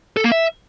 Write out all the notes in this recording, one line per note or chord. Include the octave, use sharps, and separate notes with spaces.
A4
A#3
E5